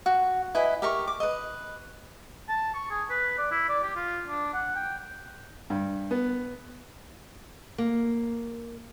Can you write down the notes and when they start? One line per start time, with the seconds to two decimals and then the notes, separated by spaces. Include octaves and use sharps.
0.06 F#4
0.55 E4 B4 D#5 G#5
0.82 G4 A#4 C#6
1.07 D6
1.20 B4 D#5
2.49 A5
2.74 C#6
2.90 G#4
3.10 B4
3.38 D5
3.51 E4
3.69 D5
3.83 G4
3.95 F4
4.28 D4
4.53 F#5
4.76 G5
5.70 G2
6.11 B3
7.78 A#3